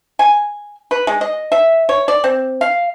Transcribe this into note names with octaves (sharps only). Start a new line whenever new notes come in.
G#5
B4
G#3
D#5
E5
C#5
D5
C4
F5